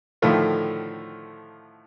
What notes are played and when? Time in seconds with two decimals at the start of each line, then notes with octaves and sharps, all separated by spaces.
0.22 A2 D3 D#3 F3 A3 F4